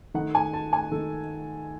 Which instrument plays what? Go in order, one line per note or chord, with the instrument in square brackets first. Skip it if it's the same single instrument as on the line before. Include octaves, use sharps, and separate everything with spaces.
[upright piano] D#3 A3 D#4 F#5
G#5
A5
G#5
D#3 A3 D#4 A4